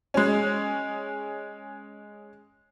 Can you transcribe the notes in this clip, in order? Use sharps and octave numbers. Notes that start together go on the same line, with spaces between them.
G#3 C#4